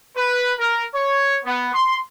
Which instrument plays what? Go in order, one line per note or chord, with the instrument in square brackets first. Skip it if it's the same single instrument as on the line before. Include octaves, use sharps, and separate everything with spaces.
[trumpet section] B4
A#4
C#5
B3
C6